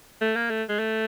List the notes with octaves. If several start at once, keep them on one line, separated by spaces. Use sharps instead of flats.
A3
A#3
A3
G#3
A3